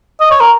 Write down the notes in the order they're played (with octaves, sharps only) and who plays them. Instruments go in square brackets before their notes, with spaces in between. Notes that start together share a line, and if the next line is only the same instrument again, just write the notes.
[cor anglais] D#5
C#5
A#4